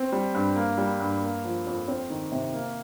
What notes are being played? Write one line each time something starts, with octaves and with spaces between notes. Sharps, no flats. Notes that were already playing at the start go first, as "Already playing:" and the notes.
Already playing: C4
G3
G2
A#3
G3
G2
A#3
F3
F2
C4
D#3
C3
A#3